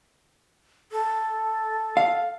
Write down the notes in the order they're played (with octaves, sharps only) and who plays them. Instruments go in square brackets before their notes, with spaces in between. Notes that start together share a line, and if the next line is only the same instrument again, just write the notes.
[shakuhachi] A4
[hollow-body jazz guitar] F5